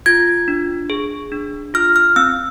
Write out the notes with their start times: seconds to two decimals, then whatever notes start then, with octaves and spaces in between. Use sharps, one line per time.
0.06 F4 G#6
0.48 D4
0.90 G#4
1.32 D4
1.74 F4 F6
1.96 F6
2.16 C4 E6